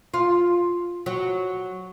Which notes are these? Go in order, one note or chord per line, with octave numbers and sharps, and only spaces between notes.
F4
F#3